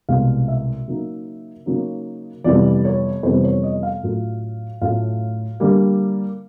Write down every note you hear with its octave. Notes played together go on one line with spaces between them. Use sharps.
C2 B2 G#3 F5
E5
C#3 F#3 A#3 D#4
C#3 F#3 A#3 D#4
F2 C3 E3 G3 B3 D5
C#5
F2 C3 E3 G3 B3 C5
C#5
D#5
F5
A2 F#3 A3 C#4 F4
A2 F#3 A3 C#4 F4 F5
D3 G3 A#3